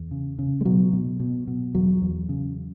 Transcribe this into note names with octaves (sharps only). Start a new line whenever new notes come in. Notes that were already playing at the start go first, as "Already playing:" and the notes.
Already playing: E2
C#3
C#3
G#3
B2 F#3
B2
B2
B2
E2 F#3
E2
C#3